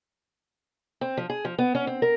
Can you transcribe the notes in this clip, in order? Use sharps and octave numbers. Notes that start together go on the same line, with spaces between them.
C4
F3
G#4
F3
B3
C#4
C4
A#4